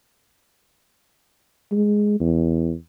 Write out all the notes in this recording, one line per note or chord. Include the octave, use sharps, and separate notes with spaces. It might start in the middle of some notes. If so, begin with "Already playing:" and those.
G#3
E2